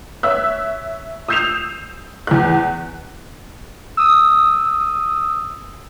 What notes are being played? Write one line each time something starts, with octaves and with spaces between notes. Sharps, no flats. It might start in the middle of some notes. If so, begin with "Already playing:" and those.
C#5 E5 E6 F#6
D#6 E6 G6 C7 E7 F7
E2 F#6
D#6 E6